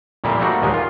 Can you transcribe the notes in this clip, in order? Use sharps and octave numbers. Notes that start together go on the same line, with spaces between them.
F2 A#2 G3 A#3 E4
G3 A3 A#3 C4 D#4 F#4
D#2 A#2 F3 G#3
F4